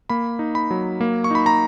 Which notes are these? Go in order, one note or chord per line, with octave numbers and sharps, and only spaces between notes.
A#3 B5
D#4
B5
F#3
A#3
C#6
D#4 B5
A#5